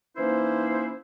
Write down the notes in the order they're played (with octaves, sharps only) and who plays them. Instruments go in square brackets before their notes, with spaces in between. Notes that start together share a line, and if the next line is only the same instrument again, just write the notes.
[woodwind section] E3 A#3 C#4 D#4 E4 C5